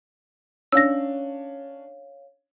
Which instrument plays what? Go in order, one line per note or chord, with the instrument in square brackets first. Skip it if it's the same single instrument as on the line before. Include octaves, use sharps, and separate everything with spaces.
[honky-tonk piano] C#4 D4 [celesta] C#5 F5 [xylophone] E6 A#6